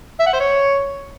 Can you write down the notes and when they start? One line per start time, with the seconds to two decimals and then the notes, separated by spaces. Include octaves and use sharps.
0.20 E5
0.26 F#5
0.33 C5
0.40 C#5